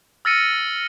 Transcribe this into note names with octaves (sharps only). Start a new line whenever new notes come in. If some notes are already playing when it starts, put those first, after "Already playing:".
E6 F6 A6 A#6 C#7 D#7